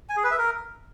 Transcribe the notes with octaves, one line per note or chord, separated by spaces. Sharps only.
G#5
G#4
B4
E5
A#4